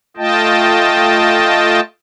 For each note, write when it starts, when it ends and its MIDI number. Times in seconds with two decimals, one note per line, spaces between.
0.17 1.80 57
0.17 1.80 65
0.17 1.80 75
0.17 1.80 79
0.17 1.80 81